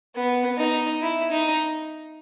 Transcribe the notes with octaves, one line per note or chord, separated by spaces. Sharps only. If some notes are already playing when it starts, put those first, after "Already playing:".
B3
D#4
E4
D#4